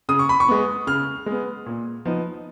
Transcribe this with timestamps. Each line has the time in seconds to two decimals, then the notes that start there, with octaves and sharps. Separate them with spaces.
0.09 C#3 D#6
0.19 C#6
0.29 B5
0.40 C#6
0.48 G#3 B3
0.87 C#3 F6
1.26 G#3 B3
1.66 A#2
2.05 F3 B3 D#4